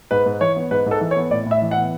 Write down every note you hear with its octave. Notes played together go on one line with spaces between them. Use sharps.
G#2 B4
G#2
E3 C#5
B3
G#2 B4
G#2
A4
E3
C#5
B3
A2 D5
A2 E5
E3
F#5
B3